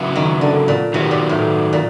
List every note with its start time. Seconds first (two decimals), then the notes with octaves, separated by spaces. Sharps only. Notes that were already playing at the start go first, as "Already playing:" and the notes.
Already playing: C#3 F#3 B3 E4
0.16 D#3
0.41 D3
0.68 A#2
0.93 C3 D#3 F#3 B3
1.11 A#2
1.29 A2
1.73 A#2